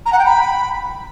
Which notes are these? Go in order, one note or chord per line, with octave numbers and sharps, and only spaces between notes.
A#5
F#5
G5
B5